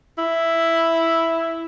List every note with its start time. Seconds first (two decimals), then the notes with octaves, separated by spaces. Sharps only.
0.18 E4